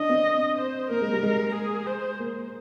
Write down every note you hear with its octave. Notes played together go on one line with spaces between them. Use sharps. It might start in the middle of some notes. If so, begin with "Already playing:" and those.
Already playing: D4 D#5
C4
C5
A#3 A#4
G#3
G3
G#3
G#4
C5
A#3